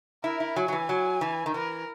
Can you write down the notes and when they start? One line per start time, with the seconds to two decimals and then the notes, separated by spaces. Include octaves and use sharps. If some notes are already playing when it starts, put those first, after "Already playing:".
0.24 E4 A#4
0.40 E4
0.56 F#3 G#5
0.68 F#3
0.72 E3
0.89 F#3
1.21 E3
1.46 D#3
1.54 E3 A#4